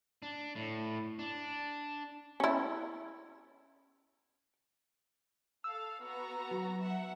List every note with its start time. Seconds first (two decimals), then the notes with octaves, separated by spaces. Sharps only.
0.22 D4
0.56 A2
1.19 D4
2.40 C#4 E4
5.64 A4 F5 E6
6.01 B3 F#4 A#5
6.51 F#3
6.82 E5 F#5